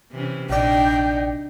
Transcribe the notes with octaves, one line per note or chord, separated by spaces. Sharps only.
C3 E3 C#4
A#1 D4 D#4 D5 G5